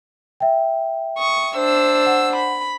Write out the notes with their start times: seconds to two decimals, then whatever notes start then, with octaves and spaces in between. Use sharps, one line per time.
0.40 E5 G5
1.17 C#6 D#6
1.56 D4 C5 E6
2.06 F#5
2.36 B5